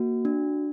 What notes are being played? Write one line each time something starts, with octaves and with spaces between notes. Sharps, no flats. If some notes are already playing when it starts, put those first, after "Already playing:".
Already playing: A#3 F#4
D4